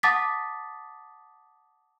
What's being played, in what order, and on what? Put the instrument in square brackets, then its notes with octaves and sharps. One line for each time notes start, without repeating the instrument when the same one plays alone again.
[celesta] F#5 A5 D6 D#6 A6 B6